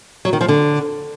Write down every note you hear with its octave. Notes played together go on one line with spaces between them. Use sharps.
F#3
D#3
F3
D3